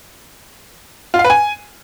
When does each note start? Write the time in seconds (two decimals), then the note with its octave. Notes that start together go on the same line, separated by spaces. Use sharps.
1.14 F4
1.19 F5
1.24 B4
1.30 G#5